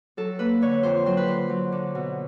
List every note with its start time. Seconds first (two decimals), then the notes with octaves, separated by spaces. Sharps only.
0.17 F#3 A4
0.39 A#3 B4
0.61 D3 C#5
0.83 F2 C5
1.06 F#3 C5
1.17 B4
1.27 D3 C5
1.50 F#3
1.72 D3
1.95 B2